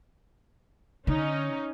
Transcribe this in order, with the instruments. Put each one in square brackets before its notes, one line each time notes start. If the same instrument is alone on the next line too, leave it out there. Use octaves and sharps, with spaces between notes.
[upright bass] D3 [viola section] C#4 D#4